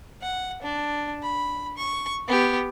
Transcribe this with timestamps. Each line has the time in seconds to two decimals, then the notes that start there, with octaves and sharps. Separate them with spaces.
0.21 F#5
0.63 D4
1.22 B5
1.78 C#6
2.28 B3 G4